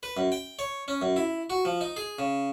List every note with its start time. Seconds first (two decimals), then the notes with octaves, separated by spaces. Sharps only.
0.03 B4
0.17 F#2
0.32 G5
0.59 C#5
0.88 C#4
1.01 F#2
1.16 E4
1.50 F#4
1.65 F3
1.81 D#4
1.97 G#4
2.19 C#3